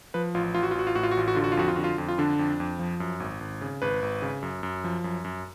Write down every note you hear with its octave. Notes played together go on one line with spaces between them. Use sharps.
F3 B4
A1 F4
A1 F4
F#4
F4
A1 F#4
F4
A2 F#4
F4
F#4
A1 F4
F#4
D3 F4
F#4
F4
F2 F#4
F4
D3 F#4
F4
F2
F4
D3 D4
F2
F2
F3
F#2
G#1
G#1
C#3
G#1 B4
G#1
C#3
F#2
F#2
F3
F#2
F#2